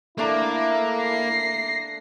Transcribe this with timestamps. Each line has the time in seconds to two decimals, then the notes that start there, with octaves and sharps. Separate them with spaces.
0.18 A3 A#3 D4 E4 A#5
1.02 A#6 C7